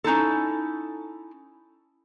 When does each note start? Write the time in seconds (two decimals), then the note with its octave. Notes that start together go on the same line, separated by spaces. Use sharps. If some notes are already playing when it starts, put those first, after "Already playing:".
0.04 C#4 D#4 E4 A4